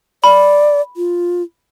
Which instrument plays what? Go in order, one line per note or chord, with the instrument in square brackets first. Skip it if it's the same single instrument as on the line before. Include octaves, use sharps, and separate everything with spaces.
[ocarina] D5 [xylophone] B5
[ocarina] F4